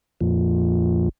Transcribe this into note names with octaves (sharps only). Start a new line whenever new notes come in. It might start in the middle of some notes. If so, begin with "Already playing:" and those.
F2 A#2 F3